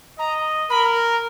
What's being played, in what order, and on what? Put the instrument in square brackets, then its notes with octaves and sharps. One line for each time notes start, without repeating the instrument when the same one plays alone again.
[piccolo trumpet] D#5 [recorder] A#5
[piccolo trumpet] A#4 [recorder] B5